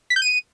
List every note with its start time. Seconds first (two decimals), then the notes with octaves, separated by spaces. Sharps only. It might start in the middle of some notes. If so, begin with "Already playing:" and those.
0.10 B6
0.16 G6
0.22 D#7